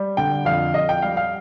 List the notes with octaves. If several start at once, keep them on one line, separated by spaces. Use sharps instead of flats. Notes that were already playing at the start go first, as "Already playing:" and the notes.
Already playing: G3
D3 G5
F2 F5
F2 D#5
G5
G3 F5
F5